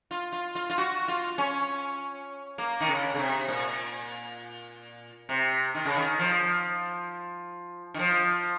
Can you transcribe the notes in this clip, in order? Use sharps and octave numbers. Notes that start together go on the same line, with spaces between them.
F4
F4
F4
F4
F#4
F4
C#4
A#3
D#3
C#3
C#3
C3
A#2
C3
D#3
C#3
D#3
F3
D#3
F3